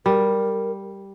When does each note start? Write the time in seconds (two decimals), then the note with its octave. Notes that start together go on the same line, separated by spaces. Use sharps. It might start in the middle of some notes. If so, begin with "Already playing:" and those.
0.06 G3 A#4